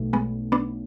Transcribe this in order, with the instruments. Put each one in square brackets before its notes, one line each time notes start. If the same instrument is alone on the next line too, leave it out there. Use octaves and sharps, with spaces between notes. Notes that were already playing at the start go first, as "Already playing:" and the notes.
Already playing: [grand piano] B1 B2 A3
[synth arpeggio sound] G#3 B3
B3 D4